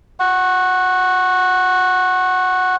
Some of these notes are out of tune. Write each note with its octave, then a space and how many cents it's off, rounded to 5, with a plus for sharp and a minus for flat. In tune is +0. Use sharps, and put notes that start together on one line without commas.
F#5 +0 C#6 -25